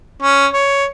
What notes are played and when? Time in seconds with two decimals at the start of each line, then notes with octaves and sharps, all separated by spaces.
0.22 C#4
0.53 C#5